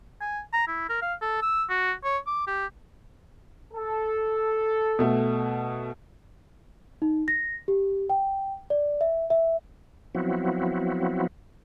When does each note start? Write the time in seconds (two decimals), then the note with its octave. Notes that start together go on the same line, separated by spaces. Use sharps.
0.21 G#5
0.53 A#5
0.68 E4
0.89 A#4
1.02 F5
1.22 A4
1.42 E6
1.70 F#4
2.04 C#5
2.27 D6
2.47 G4
3.73 A4
4.99 B2 A3
7.02 D#4
7.28 A#6
7.68 G4
8.10 G5
8.70 D5
9.01 E5
9.30 E5
10.15 F3 F#3 B3 C4 E4 F#4